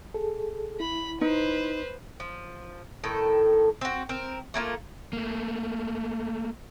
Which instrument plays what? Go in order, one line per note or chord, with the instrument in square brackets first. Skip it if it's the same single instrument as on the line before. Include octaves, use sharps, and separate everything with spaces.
[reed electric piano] G#4 A4
[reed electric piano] E4 [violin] B5
[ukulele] D#4 [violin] B4 C5
[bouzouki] F3
A2 D#3 A4
C4 F#4
C4 A#4
A3 A#3 D#4 F4
[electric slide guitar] A3 A#3